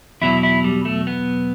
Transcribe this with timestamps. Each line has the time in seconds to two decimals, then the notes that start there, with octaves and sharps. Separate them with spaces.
0.21 E2 B2 F#3 E4
0.43 E4
0.64 G3
0.85 A3
1.07 B3